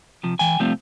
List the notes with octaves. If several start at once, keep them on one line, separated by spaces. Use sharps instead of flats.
C3 F3
E3 G5 G#5
C3 F3 G3 A3 C4 F4